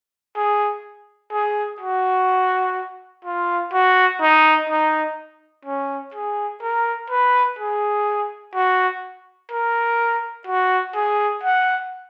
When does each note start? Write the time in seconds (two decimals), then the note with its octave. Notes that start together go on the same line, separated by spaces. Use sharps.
0.36 G#4
1.32 G#4
1.80 F#4
3.25 F4
3.73 F#4
4.21 D#4
4.69 D#4
5.65 C#4
6.14 G#4
6.62 A#4
7.10 B4
7.59 G#4
8.55 F#4
9.51 A#4
10.47 F#4
10.95 G#4
11.43 F#5